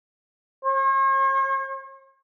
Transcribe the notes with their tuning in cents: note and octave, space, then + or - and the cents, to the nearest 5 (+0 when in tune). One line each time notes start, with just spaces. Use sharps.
C#5 -45